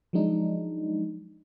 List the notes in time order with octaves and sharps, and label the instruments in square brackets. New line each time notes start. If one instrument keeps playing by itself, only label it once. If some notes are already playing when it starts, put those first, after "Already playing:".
[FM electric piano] F3 F#3 G#3 D4 D#4